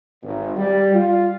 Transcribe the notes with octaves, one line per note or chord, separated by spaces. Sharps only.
G#1
G3
F4